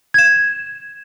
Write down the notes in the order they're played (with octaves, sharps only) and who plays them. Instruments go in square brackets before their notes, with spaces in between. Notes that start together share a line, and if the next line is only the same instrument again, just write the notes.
[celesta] G#6 E7